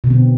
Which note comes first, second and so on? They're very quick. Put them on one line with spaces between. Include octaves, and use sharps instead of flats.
B2 D3 C4